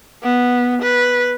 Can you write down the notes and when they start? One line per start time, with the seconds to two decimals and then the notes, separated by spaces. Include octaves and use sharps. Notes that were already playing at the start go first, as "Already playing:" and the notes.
0.23 B3
0.82 B4